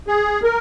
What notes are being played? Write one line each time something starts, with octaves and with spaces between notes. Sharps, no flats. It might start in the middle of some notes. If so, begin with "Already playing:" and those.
G#4
A#4